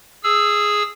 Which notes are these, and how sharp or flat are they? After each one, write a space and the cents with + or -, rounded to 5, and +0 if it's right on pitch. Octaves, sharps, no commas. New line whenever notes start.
G#4 +0 E6 +5